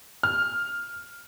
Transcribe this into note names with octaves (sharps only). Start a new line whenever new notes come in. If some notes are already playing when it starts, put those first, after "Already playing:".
F6